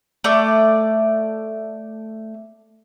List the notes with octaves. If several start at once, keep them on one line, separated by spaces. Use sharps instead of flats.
A3 D5